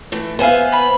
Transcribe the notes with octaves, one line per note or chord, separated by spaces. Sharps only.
E3 A3
B3 B4 C5 E5 F5 G#5
B5